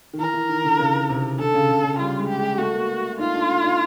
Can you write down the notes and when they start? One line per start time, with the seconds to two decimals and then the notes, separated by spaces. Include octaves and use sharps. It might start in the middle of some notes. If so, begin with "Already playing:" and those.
0.13 D#3
0.19 E3 A#4
0.34 E3
0.49 D#3
0.64 D3
0.79 C#3
1.09 C3
1.39 D3 A4
1.54 C#3
1.68 C#3
1.83 C#3
1.99 G3 F4
2.19 G#3
2.29 G4
2.39 G#3
2.58 A3 F#4
2.73 A#3
3.18 D#4 F4
3.34 D4
3.49 D4
3.63 D#4